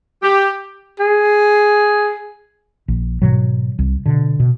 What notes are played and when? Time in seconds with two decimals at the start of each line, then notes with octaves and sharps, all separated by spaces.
0.22 G4
0.99 G#4
2.88 A#1
3.22 G#2 B2 D#3 F#3
3.79 C2
4.06 B2 D3
4.40 B2